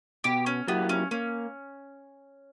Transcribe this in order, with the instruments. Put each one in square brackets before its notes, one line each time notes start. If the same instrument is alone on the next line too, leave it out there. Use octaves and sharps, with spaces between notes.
[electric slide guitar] B2 [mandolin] G4
[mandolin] C#4
[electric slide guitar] F#3 A#3 E4 G4 [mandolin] B3
[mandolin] C#4
[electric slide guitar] A#3 [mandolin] C#4